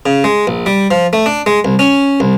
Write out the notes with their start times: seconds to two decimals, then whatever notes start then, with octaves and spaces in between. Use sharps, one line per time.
0.06 C#3
0.24 G#3
0.47 A#1
0.66 G3
0.91 F3
1.13 A3
1.26 D4
1.46 G#3
1.65 C2
1.79 C#4
2.20 C2